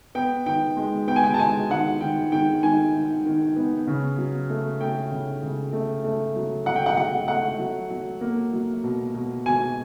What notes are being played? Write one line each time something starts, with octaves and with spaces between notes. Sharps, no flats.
B3 G5
D#3 G5
G#3
B3 G5
G#5
G5
A5
G#3 G#5
D#3 F#5
D#3 G5
D#3 G5
D#3 G#5
D#3
D#3
B3
C#3
F#3
A3
A3 G5
C#3
C#3
A3
A3
F#3
F#3 F#5
G5
F#5
F#3 F#5
A3 F#5
F#3
F#3
A#3
F#3
B2
B2
B2 G#5